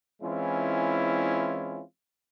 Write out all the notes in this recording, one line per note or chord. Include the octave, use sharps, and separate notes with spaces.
E3 G#3 C4 C#4 E4 F4